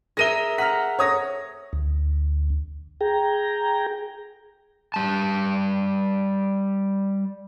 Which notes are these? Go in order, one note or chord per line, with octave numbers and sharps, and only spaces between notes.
G#4 A#4 E5 A#6 D#7 G7
F#5 A#5 F6 B6
C#5 D#6 A#6
D2
G#4 G5 A#5
G3 A5